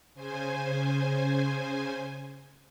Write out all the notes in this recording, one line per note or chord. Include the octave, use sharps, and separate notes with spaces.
C#3 C5 G#5